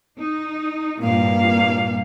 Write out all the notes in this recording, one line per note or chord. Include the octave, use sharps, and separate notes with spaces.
D#4
G2 A#2 A#3 F5